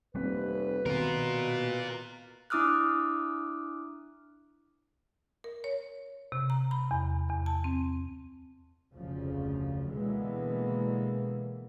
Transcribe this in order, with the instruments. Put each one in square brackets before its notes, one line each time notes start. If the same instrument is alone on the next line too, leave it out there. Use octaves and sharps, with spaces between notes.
[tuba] F1 [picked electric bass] G3 A#3 C4 [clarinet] B4
[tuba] B2 [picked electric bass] D#3 B3 C4 [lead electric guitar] F4 A#4
[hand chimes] D4 E4 D6 D#6 F6 F#6
[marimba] A#4
C#5
C3
A#5
B5
E2
E2
A5
C4
[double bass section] F1 D2 C#3 F3
B2 D3 E3 G#3 A#3 B3